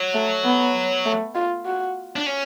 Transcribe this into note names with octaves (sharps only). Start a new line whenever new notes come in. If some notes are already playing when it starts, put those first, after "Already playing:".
Already playing: F#3
A3
B3
A3
F4
F#4
D4
C#4